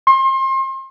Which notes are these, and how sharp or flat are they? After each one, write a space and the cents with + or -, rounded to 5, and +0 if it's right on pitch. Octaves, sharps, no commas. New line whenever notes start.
C6 +35